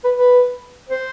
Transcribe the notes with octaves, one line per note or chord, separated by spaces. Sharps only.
B4
B4
C5